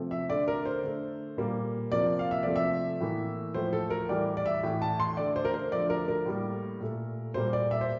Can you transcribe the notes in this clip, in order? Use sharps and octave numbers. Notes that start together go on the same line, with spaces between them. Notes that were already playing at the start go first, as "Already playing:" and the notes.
Already playing: C3 F3 A3
E5
D3 A3 D5
A#4
C5
D3 A3
A#2 G3 A#3
C3 F3 A#3 D5
F5
E5
C3 F3 A3 D5
E5
A2 E3 A#3
A2 F3 A3 C5
A4
A#4
A2 E3 G3 D5
D5
E5
A2 E3 A3
A5
C6
D3 A3 D5
C5
A#4
C5
D3 F3 A3 D5
A#4
A#4
A2 G3 A#3
A#2 A3
A#2 G3 A#3 C5
D5
E5
C5